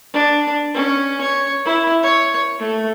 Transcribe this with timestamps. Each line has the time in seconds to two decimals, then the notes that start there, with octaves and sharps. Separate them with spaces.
0.14 D4
0.75 C#4
1.21 C#5
1.66 E4
2.03 C#5
2.59 A3